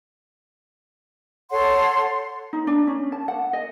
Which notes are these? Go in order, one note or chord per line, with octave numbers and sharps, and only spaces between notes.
A4 C#5 F#5 C6
D#4
D4
C#4
A5
F#5
D#5